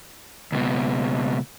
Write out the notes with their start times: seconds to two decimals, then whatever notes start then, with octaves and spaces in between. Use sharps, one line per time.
0.52 C#2 B2